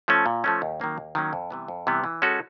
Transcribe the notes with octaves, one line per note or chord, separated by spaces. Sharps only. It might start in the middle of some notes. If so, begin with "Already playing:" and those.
F3 A3 C#4
A#2
F3 A3 C#4
D#2
D#3 F#3 A#3 C#4
D#2
D#3 F#3 A#3 C#4
F2
C3 E3 G3 B3
F2
C3 E3 G3 B3
E3
G#3 C#4 F#4 A4